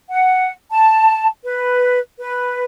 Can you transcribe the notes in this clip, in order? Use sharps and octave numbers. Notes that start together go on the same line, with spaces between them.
F#5
A5
B4
B4